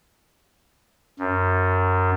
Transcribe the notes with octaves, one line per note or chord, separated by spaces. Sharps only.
F#2